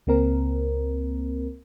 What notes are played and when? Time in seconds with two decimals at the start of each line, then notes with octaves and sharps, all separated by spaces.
0.07 C#2 A#3 C4 A#4